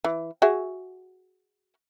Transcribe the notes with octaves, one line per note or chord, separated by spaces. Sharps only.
E3
F#4 G#4 E5